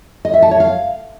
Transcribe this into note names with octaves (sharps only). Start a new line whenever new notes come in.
D#5
E5
A5
C#5
F5